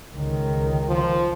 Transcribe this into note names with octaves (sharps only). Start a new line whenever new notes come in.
C#2 D#3
F3